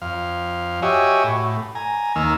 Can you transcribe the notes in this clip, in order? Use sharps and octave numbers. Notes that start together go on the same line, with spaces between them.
F2 F5
F#4 G4 C#5 D#5 E5 G#5
A2
G#5 A#5
D#2 D#3 A#3 E6 F6